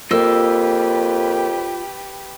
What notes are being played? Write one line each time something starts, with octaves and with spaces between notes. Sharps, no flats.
F2 A#3 F4 G4 B4 D#5 E6